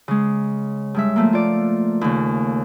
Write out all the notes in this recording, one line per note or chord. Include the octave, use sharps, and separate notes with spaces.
C#3 G#3
G2 G#3 E5
F3 A3 A#3
F4 D5
D#2 C#3